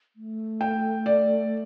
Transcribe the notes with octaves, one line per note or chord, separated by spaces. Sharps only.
A3
G5
D5